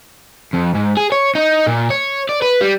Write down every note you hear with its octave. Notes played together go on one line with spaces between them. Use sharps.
F2
G#2
G#4
C#5
D#4
A#2
C#5
D5
B4
G3